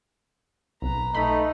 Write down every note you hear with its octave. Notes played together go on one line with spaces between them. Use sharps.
B1 B4 A#5
A3 D#4 B5